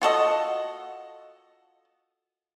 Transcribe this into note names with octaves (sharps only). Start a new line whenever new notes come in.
F4 F#4 A4 D#5